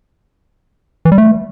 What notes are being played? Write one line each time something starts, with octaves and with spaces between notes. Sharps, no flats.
E3
G3
A3